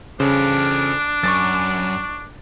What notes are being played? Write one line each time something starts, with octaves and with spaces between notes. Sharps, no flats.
C#3 D4 A4 C5
F#2 C#6 D6 A6